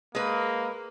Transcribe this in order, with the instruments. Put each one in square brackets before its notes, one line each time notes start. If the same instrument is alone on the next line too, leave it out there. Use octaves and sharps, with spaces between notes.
[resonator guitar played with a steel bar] G#3 B4 [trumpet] A#3